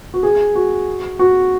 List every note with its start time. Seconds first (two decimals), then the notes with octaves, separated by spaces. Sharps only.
0.14 F#4
0.23 G#4
0.55 F#4
1.19 F#4